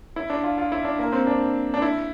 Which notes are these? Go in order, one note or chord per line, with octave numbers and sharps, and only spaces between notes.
E4
D4
F4
F4
E4
D4
A#3
C4
D4
D4
E4